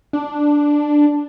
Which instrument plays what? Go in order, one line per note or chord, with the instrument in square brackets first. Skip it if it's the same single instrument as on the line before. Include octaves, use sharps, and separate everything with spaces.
[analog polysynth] D4